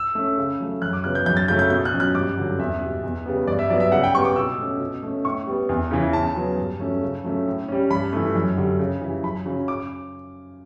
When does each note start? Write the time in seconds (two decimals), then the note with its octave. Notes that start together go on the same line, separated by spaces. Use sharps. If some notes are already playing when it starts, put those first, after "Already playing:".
Already playing: E6
0.15 A3 C#4
0.37 C#3
0.60 F#3 A3
0.82 F#2 F#6
0.93 D6
1.04 C#3 F#3 B3 F#6
1.15 G6
1.26 F#2 G6
1.37 A6
1.48 C#3 F#3 A3 G6
1.59 G6
1.70 B2 G6
1.85 F#6
1.92 F#3 C#4
2.00 F#6
2.15 G2 D6
2.37 D3 F#3
2.59 E2 E5
2.81 B2 G3
3.03 E2
3.26 C#3 G3 B3
3.47 G2 D5
3.59 E5
3.70 F#3 B3 D5
3.80 E5
3.92 C#3 F#5
4.03 G5
4.14 G3 B3 C#6
4.25 D6
4.36 B2 E6
4.59 A3 C#4
4.80 B2
5.03 A3 C#4
5.25 A2 C#6
5.47 G3 B3
5.69 E2
5.91 C#3 E3
6.13 C#3 A5
6.36 F#3 B3
6.58 G2
6.80 F#3 A3 C#4
7.02 C#3
7.24 F#3 A3 C#4
7.46 A2
7.68 G3 C#4
7.91 G2 B5
8.13 E3 A3
8.35 F#2
8.57 D3 G3
8.79 C#3
9.01 E3 G3
9.23 F#2 B5
9.46 C#3 F#3 C#4
9.68 D6